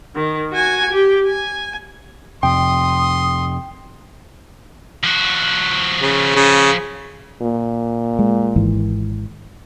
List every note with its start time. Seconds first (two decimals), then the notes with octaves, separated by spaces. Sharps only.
0.15 D#3
0.52 F#4 G#5
0.90 G4
1.27 G#5
2.43 F2 C3 G5 C6 D#6
5.04 F3 F#4
6.02 C#3
6.36 C#3
7.42 A#2
8.19 G#3
8.56 G#1 G#2 E3